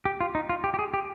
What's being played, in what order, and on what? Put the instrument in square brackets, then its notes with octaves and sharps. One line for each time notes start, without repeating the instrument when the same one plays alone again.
[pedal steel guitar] G4
F4
D#4
F4
G4
G4
G#4
G4